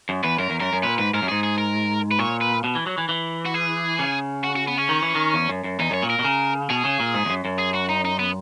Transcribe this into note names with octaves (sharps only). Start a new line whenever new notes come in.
F#2
E2 B4
F#2 A#4
E2
F#2 A#4
F#2
A#2 B4
G#2 B4
G#2 A#4
F#2
G#2 G#4
G#4
A#4
B4
A#2 C#5
B4
B2
E3
F#3
E3
E3
F#4
G#4
C#3
F#4
F#4
B3
C#4
D#3
E3
D#3
E2
F#2
F#2
E2 D#4
F#2 C#5
A#2
A#4
B2
C#3
B2 G#4
C#3
A#2
G#2
E2
F#2
F#2
G#4
F#4
D#4
D#4
B3